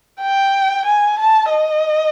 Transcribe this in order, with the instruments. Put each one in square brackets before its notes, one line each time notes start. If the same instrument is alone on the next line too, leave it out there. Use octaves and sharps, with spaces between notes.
[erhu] G5
G#5
A5
D#5